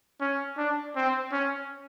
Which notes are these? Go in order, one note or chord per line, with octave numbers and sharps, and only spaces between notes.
C#4
D4
C4
C#4